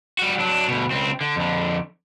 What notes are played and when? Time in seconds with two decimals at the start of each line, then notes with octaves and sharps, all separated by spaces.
0.19 G3 F#4
0.39 F#3 D4
0.68 D2 B2
0.91 C#2 C4
1.21 D3
1.36 F2 D3